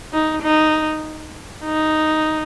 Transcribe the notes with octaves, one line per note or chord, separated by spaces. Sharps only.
D#4
D#4
D#4